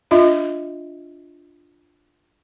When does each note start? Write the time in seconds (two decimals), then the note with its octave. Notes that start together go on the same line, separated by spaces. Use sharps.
0.11 D4 F4 D#5 E5